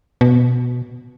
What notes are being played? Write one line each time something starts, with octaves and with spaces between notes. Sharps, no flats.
B2